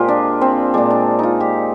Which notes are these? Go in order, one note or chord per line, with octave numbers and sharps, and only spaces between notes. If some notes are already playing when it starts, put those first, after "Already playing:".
Already playing: A#2 G#3 F4 G4 C5
D4
C4
A#2 G#3 D4
D4
D#4 F4
G4